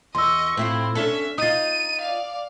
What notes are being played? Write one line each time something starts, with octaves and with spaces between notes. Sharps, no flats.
E2 D#5 C6 C#6 E6
A2 C4 E4 F4
C#4 D4 A4 E5
D#4 F4 D#6 A6 D#7
D5 F5